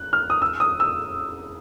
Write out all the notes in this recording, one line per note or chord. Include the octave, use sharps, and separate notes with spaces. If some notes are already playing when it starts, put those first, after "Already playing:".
Already playing: F#6
F6
D#6
E6
D#6
E6